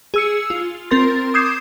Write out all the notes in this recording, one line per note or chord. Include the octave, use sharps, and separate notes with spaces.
G#4 E6 C#7
F4
C4 A#4 C6 A6
D6 D#6 G6 G#6 C7 E7